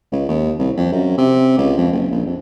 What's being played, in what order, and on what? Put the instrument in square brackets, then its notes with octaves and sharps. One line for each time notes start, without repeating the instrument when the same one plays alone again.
[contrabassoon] C#2
D#2
C2
F2
F#2
C3
C#2
F2
F#1
A#1
F2